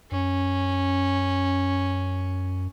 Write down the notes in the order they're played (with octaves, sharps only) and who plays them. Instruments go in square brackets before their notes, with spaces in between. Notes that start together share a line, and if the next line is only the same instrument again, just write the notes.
[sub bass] F#2 [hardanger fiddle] C#4